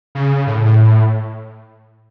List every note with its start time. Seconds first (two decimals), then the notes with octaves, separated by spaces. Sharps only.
0.15 C#3
0.47 A2